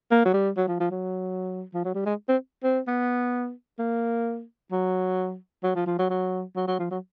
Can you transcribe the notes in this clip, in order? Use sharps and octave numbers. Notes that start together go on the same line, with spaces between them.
A#3
F#3
G3
F#3
F3
F3
F#3
F3
F#3
G3
G#3
C4
C4
B3
A#3
F#3
F#3
F3
F3
F#3
F#3
F#3
F#3
F3
F#3